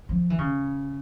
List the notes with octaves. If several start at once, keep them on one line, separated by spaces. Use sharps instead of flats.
F3
E3
C#3